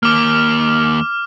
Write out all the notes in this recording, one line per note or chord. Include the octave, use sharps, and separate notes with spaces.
D#2 A#3 D6 F6